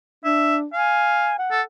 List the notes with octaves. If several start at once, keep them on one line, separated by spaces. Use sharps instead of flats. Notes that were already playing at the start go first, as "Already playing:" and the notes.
D4 E5
F5 G#5
F#5
A4